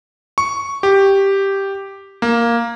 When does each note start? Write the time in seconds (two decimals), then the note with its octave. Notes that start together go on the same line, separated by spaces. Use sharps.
0.38 C#6
0.83 G4
2.22 A#3